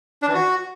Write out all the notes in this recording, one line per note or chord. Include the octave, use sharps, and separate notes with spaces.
D4
E3
F#4